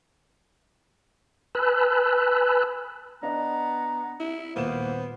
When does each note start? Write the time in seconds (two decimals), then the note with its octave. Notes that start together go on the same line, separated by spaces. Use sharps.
1.55 B4 G#5 A5 B5 E6 F#6
3.23 B3 D4 D#5 A#5
4.20 E4
4.56 D#1 A#3 B3 C5 E7